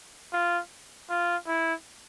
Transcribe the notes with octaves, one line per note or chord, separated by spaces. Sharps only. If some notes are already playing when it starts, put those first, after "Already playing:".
F4
F4
E4